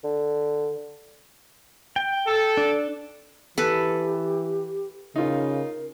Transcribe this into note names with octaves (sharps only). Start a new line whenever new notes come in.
D3
G5
A4
D4
E3 G4 A4 B4
C#3 D#4 F4 A#4